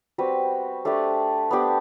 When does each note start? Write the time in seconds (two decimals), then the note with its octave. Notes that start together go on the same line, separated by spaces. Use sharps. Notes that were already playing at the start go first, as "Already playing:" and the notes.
0.18 G3 C4 F#4 B4
0.85 A3 D4 G4 D5
1.51 B3 D4 G4